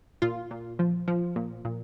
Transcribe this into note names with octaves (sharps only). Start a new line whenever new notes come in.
A#2 F4
A#2
F3
F3
A#2
A#2